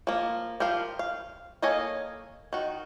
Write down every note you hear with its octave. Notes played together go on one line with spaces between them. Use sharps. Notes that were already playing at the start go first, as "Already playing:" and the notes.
F3 A#3
F3 G4 A#4 F5
F5
A#3 A4 C#5 D#5 G#5
D#3 F#4